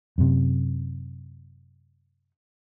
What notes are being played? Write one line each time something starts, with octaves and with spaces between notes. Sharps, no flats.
F#2 C3